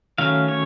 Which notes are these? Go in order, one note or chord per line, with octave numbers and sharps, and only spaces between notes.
D#3 F#3 A3 C#4 F5
C#5